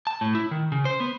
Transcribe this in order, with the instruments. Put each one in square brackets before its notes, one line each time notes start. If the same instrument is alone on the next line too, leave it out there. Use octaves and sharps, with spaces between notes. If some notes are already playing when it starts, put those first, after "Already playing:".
[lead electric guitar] A5
A2
E4
D#3
C#3
C5
B3